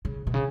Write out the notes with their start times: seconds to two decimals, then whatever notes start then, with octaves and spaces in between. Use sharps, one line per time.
0.05 C#3
0.27 B2
0.34 C#3